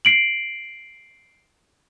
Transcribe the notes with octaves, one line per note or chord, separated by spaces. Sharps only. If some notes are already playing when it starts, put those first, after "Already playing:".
C7 D7 F#7